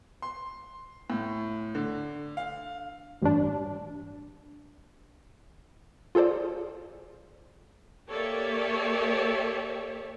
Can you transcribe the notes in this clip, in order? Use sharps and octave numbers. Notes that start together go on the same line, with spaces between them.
C6
A2
D3
F5
A1 G2 D4
F4 G#4 A4 C5 D5
A#3 G4 A4 C#5 D5 E5